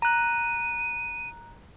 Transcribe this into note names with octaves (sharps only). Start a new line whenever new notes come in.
A#5 F#6 D#7